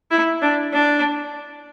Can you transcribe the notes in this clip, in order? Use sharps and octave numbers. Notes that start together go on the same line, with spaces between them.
E4
D4
D4